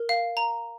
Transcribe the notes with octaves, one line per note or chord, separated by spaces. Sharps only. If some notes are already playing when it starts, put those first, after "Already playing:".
Already playing: A#4
F5
A#5